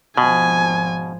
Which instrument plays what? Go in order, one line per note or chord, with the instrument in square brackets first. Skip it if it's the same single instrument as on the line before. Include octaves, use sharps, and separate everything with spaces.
[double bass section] G#1 F3 [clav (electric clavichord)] B2 [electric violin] G#5